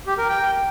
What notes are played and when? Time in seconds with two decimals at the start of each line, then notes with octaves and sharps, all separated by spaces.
0.07 G4
0.18 A#4
0.29 G5